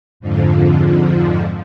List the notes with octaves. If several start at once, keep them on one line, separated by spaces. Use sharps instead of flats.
F2 G#2 D3 F3